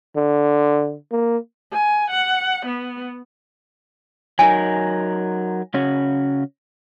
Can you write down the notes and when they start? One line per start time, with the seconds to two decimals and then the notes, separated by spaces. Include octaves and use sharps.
0.16 D3
1.12 A#3
1.73 G#5
2.10 F#5
2.66 B3
4.39 F#3 D#4 A#4 G#5
5.74 C#3 C#4 F#4